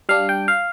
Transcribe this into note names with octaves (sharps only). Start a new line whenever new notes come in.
G3 D4 F5
G5
F5